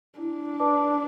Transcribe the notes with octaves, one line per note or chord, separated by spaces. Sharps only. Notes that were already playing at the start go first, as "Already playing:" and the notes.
D4 E4
B4 D5 A5 D6